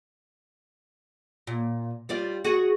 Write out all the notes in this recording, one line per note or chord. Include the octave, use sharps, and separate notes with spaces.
A#2
G3 F4 D5
F#4 G#4